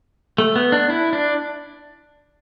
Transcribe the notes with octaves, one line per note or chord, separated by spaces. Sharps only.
A3
B3
D4
E4
D4